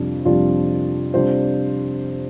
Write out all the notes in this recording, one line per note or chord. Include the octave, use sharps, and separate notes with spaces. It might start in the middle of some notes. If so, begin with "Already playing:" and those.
Already playing: F2 C3 G3 D4
F2 C3 G3 D4 F4
C3 G3 D4 F4 C5